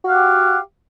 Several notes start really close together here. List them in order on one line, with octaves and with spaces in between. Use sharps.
F#4 F5 F#5 G4